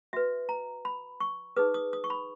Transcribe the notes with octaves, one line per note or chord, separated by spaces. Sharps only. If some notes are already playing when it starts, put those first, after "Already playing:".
F#4 B4 E5
A#5
B5
C#6
D#4 G#4 B4 D#6
D#6
D#6
C#6
B5